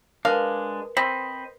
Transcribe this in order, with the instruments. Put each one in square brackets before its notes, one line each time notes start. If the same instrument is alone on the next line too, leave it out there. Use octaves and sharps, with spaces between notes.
[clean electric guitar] G#3 D4 [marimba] A#4 B4 [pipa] F5
[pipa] C4 [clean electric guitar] C5 D#5 B5